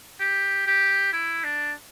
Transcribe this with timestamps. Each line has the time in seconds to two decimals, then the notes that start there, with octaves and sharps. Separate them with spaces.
0.20 G4
0.66 G4
1.13 E4
1.44 D4